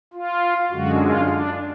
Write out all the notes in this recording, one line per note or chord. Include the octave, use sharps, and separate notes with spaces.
F4
F#2 D3 G#3 F#4
F4
D4